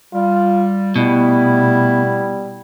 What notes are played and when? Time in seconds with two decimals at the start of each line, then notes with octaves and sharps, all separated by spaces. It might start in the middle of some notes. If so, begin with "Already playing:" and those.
0.14 G3 F4
0.96 B2 G3 A3 B3 E4